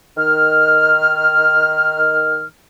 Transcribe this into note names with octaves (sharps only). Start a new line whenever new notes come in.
D#3 F6